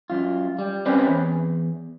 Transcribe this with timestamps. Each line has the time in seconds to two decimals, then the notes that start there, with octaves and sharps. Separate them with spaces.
0.10 F#2 F4
0.59 G3
0.86 C4 C#4 G4 B4
1.08 E2